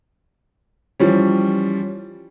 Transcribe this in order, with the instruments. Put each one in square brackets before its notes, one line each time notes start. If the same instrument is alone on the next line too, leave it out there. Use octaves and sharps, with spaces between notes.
[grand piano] E3 F3 G3 C#4